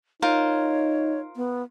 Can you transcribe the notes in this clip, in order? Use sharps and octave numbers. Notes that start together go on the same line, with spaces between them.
D#4 F4 A#4 C5 C#5
B3